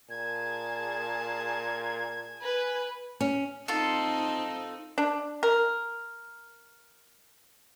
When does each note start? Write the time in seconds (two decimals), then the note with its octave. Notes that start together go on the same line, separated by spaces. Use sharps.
0.10 A#2 G#4 A5 G#6
2.40 B4 G#5
3.21 C#4
3.68 C4 D#4 F4 A4
4.98 D4
5.43 A#4